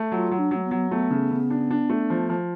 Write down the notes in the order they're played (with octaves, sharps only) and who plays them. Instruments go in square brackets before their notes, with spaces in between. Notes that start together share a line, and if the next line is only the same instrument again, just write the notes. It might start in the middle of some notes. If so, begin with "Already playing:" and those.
Already playing: [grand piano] A3
[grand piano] F#3 [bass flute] F4
[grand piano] F#3
[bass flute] D4
[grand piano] F#3 [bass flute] A3
[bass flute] B3
[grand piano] F#3
[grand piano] A3 [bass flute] B3
[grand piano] C#3
C#3
D4
D4
A3
F3
F3